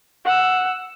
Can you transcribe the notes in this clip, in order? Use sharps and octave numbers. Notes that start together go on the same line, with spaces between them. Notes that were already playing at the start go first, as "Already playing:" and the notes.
F#5 E6